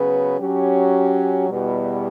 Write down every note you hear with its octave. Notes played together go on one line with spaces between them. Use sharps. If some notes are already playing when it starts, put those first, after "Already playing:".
Already playing: C#3 F#3 B3 F#4 B4
F#3 C#4 G4
E2 B2 G3